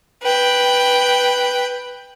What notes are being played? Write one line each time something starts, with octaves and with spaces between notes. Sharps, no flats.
B4 G5